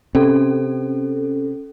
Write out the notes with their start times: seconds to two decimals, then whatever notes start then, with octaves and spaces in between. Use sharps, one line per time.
0.15 C3 C#4 A4